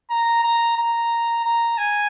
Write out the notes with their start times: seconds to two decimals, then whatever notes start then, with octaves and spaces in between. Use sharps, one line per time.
0.10 A#5
0.43 A#5
0.77 A#5
1.45 A#5
1.78 G#5